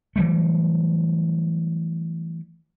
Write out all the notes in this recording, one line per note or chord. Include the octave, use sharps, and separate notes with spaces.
E3 F#3 G3 A3